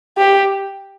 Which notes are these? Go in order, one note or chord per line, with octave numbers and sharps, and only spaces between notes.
G4